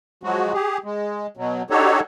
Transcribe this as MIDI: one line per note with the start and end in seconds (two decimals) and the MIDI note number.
0.23 0.53 53
0.23 0.53 54
0.23 0.53 56
0.23 0.53 66
0.53 0.78 67
0.53 0.78 68
0.84 1.27 56
1.37 1.62 47
1.37 1.62 54
1.70 2.00 62
1.70 2.00 63
1.70 2.00 66
1.70 2.00 67
1.70 2.00 69
1.70 2.00 73